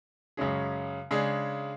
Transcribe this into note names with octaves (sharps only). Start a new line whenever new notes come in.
F#2 C#3 G#3 C#4 G#4
C#3 G#3 D4 G#4